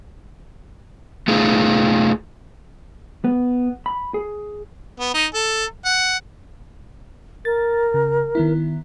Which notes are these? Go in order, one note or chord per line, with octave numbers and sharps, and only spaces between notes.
A3 D#4 F4 G#4 A4
B3
B5
G#4
B3
D#4
A4
F#5
A#4 A6
C#3
D#3 B3 E4